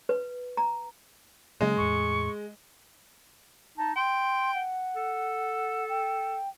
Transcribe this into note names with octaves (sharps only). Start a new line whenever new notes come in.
B4
A#5
C#3 F#3 G#3 A#3
E2 A2 C#6
D#4 A5
G5 C6
F#5
A4
G5